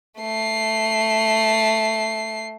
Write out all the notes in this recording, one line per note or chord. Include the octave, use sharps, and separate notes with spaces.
A3 C7